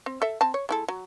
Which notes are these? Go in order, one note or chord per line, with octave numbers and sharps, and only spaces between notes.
C4
A4 E5
C4 A5
C#5
G#3 E4 A4
F#3